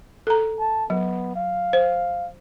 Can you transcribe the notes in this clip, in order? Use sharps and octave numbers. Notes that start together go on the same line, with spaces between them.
A4 A#5
A5
F#3 B3
F5
C5